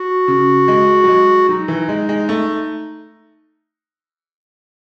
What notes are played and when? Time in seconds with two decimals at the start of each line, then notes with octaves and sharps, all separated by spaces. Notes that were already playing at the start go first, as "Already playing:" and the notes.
Already playing: F#4
0.28 C#3
0.68 G#3
1.04 F#3
1.08 G#3
1.49 F#3 D#4
1.68 E3
1.89 G#3
2.09 G#3
2.29 A3